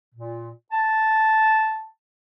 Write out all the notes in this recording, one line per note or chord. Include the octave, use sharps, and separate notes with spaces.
A#2
A5